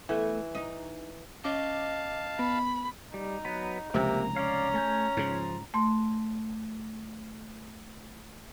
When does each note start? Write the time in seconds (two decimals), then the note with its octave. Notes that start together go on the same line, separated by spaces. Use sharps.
0.09 E3 A3 B3
0.55 D#4
1.44 C#4 D#5 F5 A5 D6
2.39 B3 B5
3.14 G3 D#4
3.45 F#3 B3 B4
3.94 F1 C#2 C3 A#3 C4 A#5
4.36 C#4 D5 F5
4.74 A3 G#5 G6
5.17 G#2 C#3 F3
5.74 A3 C6